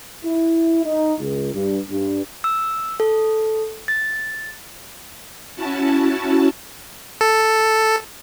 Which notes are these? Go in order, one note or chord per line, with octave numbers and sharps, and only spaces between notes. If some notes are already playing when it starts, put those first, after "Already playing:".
E4
D#4
C#2
G2
G2
E6
A4
A6
C#4 E4 F#4 A5
A4